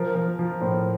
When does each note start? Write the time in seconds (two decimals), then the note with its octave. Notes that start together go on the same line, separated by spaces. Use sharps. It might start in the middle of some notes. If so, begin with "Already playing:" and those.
Already playing: F3 A#4
0.15 F3
0.39 F3
0.61 A2 C5